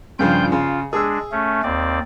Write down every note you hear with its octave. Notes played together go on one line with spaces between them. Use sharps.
G2 C#3 F3 F4 G5 G6
C#3 F4
G#3 D4 G#4 E6
A3 C#4
D#2 C4 D5